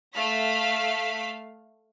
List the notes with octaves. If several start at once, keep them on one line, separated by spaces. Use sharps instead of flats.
A3 F5 B6